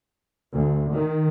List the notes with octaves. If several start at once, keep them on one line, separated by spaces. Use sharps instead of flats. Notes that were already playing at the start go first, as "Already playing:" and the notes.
D2
D#3